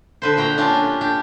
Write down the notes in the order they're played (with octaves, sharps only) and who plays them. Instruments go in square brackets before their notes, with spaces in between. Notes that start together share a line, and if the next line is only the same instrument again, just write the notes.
[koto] D3 B4 C5
A#2 F#4 G5 A#5
C#4 D4 F4 G4
D4 G4